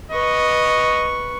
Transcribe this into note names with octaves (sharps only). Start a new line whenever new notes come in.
B4 D#5 C#6